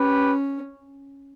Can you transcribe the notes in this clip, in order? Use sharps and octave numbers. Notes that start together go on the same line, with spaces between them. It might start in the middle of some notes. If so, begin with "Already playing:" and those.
Already playing: C#4 G4 B4